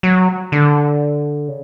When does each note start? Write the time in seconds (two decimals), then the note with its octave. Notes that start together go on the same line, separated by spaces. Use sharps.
0.03 F#3
0.52 D3
1.48 C#3